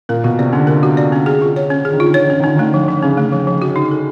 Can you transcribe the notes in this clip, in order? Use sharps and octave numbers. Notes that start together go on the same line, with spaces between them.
A#2 A#4
B2 F#4
C3 D5
D3 C#4
A#4
F#4
D5
C#4
G#4
F4
C#5
C#4
D3 G#4
D#3
D3 F4
D#3
D3 C#5
D#3
D3 C#4
D#3
D3 C#4
D#3
D3 A3
F3
F3
C#3 C#4
A3
F3
F3
F#4
D#4
A4